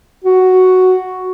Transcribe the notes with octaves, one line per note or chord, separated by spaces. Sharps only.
F#4